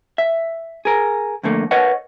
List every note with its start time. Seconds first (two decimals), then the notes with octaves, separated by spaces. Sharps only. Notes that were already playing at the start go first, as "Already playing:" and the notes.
0.18 E5
0.85 G#4 A#4
1.43 F2 D3 A3 A#3
1.71 A#4 B4 C#5 D#5 F#5